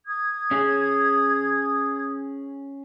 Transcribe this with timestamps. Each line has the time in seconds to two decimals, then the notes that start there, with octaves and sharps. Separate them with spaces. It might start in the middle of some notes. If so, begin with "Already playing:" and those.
0.06 D#6 G#6
0.51 C#4 G#4